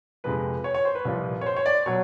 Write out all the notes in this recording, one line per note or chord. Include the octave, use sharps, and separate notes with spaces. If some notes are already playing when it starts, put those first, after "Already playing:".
F2 C3 F3 G#3 B4
C#5
C#5
C5
B4
C2 A#2 F3
C#5
C5
C#5
D5
B2 F#3 C#5